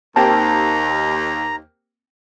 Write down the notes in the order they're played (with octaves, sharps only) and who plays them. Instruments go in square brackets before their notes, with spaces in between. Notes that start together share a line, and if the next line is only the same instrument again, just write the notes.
[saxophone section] D#2 [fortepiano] A#3 C4 G4 [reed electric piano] A5 [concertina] A#5